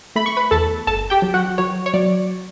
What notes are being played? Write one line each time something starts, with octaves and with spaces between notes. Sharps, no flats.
A3 B5
C#6
B4 B5
E2 A4 A5
G1 A4 A5
G4 G5
F#3
F#4 F#5
F#3 C#5
C#5
F#3 D5